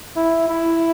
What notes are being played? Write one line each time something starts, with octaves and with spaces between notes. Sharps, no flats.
E4
E4